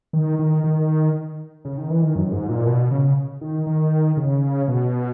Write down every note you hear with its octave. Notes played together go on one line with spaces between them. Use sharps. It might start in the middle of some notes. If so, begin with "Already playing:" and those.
D#3
D#3
D#3
C#3
D#3
E3
D#3
F#2
G#2
A#2
B2
C#3
D#3
D#3
C#3
B2